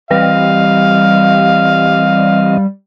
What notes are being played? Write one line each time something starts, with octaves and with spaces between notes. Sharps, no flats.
E3 G3 C4 D#5 F5